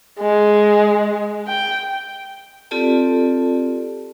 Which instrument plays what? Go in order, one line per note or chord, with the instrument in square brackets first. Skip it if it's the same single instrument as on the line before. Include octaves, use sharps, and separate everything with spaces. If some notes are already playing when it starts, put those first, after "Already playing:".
[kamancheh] G#3
G5
[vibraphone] C4 F4 G4 A4 D5 A5